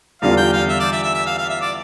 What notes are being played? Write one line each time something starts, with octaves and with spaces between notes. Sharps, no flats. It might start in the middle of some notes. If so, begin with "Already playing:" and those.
E2 D3 G3 D4 F4 F5
G5
F5
E5
D5
E5
E5
E5
F5
F5
E5
D5